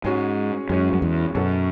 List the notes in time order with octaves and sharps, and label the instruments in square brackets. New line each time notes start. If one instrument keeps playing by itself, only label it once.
[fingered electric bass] G#2 [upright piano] G#3 C#4 F#4
[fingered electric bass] F#2 [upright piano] G#3 C#4 F#4
[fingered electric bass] F#2
E2
[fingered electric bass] F#2 [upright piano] B2 F#3 C#4 F#4 A4